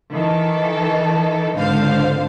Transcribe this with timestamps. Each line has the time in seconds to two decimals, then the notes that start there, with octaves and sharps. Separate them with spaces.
0.13 D#3 E3 A4
1.54 G#1 C#2 D3 C5 F5